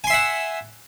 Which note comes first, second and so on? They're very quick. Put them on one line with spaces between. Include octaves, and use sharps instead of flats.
G#5 C6 E5 F#5